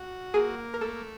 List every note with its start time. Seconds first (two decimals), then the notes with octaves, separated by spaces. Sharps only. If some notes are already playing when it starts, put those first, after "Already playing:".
Already playing: F#4
0.34 A#3 G#4
0.74 A#4
0.81 A3 A4